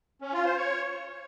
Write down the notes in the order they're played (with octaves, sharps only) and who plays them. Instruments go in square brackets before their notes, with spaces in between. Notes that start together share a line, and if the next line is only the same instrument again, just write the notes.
[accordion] C#4
F4
C5
C#5